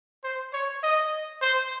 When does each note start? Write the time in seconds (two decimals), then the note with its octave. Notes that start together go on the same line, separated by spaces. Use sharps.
0.24 C5
0.53 C#5
0.83 D#5
1.42 C5